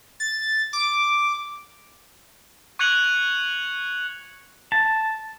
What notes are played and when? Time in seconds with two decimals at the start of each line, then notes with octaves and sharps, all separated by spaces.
0.20 A6
0.73 D6
2.79 C#6 F#6 G#6 C#7 F7 F#7
4.72 A5